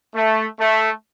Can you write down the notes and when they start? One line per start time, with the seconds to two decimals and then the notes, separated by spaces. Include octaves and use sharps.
0.15 A3
0.59 A3